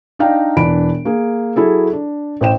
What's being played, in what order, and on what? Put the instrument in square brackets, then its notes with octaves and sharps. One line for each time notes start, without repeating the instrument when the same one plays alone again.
[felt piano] D4 D#4 D5 F5 G5 A#5
E1 E3 D4 B5 D7
A#3 G#4
F#3 E4 G#4 A4
D4
A1 C5 G5 E7